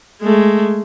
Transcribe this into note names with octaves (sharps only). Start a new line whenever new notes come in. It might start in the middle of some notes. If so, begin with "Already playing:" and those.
G#3 A3